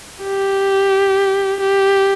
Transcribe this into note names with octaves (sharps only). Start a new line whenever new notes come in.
G4
G4